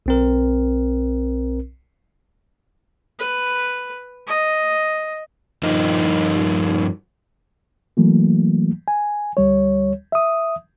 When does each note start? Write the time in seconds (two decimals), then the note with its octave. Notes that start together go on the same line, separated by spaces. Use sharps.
0.06 B1 C4 A#4
3.19 B4
4.27 D#5
5.63 G2 F3 D#4 A#4 D#5
7.97 E3 F#3 A3 A#3
8.88 G#5
9.37 D2 G3 C#5
10.12 E5 D#6